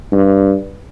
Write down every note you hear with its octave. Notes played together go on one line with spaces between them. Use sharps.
G2